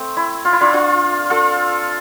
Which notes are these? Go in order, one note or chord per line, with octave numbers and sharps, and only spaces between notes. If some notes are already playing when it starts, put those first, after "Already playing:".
Already playing: A3 C4
E4
F4
E4
D4 F4
D4 F4
F4 A4